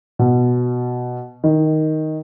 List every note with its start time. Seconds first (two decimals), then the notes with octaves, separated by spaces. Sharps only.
0.19 B2
1.44 D#3